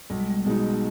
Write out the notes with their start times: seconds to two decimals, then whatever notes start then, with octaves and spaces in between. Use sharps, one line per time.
0.10 B1 G3
0.20 G#3
0.30 G3
0.45 B2 G#3 D#4